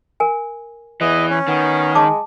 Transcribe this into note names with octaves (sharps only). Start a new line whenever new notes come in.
A#4 G#5
E2 E3 D#5
C#4
D#3 B3
G#3 A5 D6